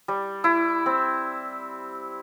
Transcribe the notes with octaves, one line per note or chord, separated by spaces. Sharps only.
G3
E4
C4